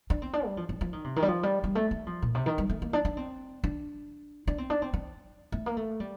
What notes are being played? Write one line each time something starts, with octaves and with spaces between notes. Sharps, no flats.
D4
C4
D4
G3
F3
F3
F3
D#3
C3
D#3
G3
F3
G3
G3
A3
A3
F3
A#2
C3
D#3
G3
A3
A#3
D4
D4
C4
D4
D4
C4
D4
C4
C4
A3
A#3
A3
G3